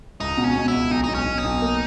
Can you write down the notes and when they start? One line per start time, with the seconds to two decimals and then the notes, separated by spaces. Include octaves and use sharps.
0.20 C#2 D#4
0.37 B2
0.44 C#4
0.56 B2
0.68 E4
0.73 C#2
0.91 B1 D#4
1.04 B1 D#4
1.14 C#4
1.26 B1
1.38 D#4
1.44 B1
1.62 A#3